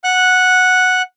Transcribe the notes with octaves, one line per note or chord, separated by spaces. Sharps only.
F#5 F#6